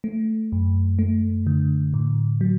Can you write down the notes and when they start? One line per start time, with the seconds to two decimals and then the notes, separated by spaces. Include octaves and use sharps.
0.04 A3
0.52 F#2
0.99 A3
1.47 D3
1.94 A2
2.41 F#3